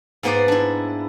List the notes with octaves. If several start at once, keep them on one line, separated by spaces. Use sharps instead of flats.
G#2 A#3 B3 B4 C5 D5
D4 E4